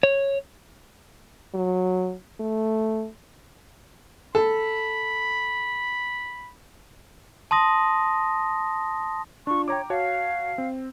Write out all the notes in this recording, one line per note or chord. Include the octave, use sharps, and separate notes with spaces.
C#5
F#3
A3
A4 B5
A5 C6 D#6 A#6
D4 F4 C#6
C#5 G5 A#5 D6
F#4 C#5 F5 A5
C4